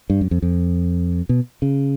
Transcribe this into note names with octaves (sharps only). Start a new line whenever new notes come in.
G2
F#2
F2
F2
B2
C#3